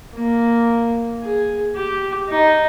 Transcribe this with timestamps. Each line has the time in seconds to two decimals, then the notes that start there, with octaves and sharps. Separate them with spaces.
0.14 A#3
1.22 G#4
1.76 G4
2.29 D#4